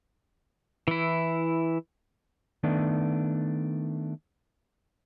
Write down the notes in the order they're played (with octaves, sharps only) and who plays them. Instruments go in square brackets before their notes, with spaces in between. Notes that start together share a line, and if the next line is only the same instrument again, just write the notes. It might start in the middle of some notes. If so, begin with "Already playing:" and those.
[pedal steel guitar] E3 E4
[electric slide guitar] D#3 A3 B3 D4